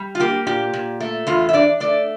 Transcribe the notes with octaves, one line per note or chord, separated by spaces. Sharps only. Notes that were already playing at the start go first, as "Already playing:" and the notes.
Already playing: G3
F4
A#3 G4
A#2 G4
A#2
A3
E2 F4
E5
D4 D5
A3 D5